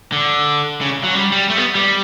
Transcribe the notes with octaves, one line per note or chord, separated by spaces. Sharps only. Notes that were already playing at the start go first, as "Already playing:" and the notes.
D3
C#3
F#3
G3
G3
A3
B3
G3